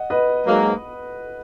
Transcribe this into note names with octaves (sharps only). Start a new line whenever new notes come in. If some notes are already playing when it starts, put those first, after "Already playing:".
Already playing: D#5 F#5
B4 D#5
G#2 F#3 A#3